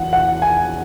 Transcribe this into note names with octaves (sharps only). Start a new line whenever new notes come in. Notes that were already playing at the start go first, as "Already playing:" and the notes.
Already playing: E2 F#5
F#5
G#5